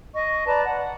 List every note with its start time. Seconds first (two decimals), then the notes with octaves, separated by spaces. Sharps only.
0.14 D#5 C#6
0.46 B4 D5 A5 A#5
0.65 F#5